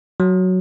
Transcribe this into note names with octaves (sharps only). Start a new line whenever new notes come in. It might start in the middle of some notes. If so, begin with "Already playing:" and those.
F#3